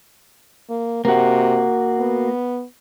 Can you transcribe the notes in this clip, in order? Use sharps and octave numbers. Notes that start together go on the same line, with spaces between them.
A#3
C3 A#3 F#4
B3